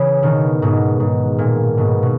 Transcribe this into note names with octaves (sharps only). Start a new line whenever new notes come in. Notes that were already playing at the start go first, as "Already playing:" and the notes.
Already playing: C#3 E3
B2 D#3
G#2 B2
G#2
A#2
G#2 B2
B2